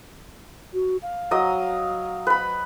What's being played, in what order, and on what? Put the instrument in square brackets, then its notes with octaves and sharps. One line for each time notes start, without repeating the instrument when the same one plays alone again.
[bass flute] F#4
F5
[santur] F#3 D#5 D#6
B4 B5